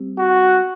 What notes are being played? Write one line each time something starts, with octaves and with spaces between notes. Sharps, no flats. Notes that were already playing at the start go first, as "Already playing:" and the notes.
Already playing: G3 C4
F#4